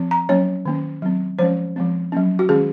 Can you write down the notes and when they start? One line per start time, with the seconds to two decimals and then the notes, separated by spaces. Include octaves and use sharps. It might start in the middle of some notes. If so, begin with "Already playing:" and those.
Already playing: F3 C4
0.11 A#5
0.29 F#3 A#3 C#4 C#5
0.65 D#3 A#3 C#4
1.02 F#3 C4
1.39 F3 G#3 C#4 C5
1.76 F3 G#3 C4
2.12 F#3 A#3 C#4
2.39 F#4
2.49 D#3 G#3 C#4 G#4